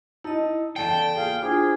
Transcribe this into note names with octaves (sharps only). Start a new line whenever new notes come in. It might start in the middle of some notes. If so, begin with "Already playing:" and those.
D#4 E4 D#5 A5
E2 C#3 A4 D5 G5 A5 D7
A#3 F4 G#4 F5
D4 E4 F4 G#4 C5